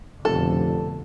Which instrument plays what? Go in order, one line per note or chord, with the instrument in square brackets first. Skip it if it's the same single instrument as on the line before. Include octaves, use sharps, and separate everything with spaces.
[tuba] F1 [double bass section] F2 B2 D3 [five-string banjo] A4